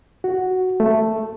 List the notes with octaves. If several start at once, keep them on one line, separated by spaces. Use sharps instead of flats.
F#4
A3